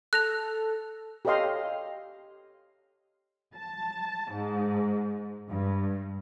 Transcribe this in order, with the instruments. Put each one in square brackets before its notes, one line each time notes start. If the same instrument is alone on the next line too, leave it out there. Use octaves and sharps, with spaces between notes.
[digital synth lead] A4 [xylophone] F#6 A#6 F7
[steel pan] G4 A4 C#5 D#5 F5 C6
[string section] A5
G#2
G2